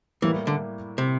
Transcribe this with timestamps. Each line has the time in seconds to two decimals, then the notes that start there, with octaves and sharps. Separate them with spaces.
0.22 A2 E3 G3 A#3 E4
0.47 D3
0.98 C3